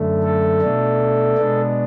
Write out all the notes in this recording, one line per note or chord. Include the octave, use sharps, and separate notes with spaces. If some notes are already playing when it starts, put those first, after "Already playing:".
Already playing: F#2 D3 A3
A4
B2 A3 D4
B2 G#3 B3 D4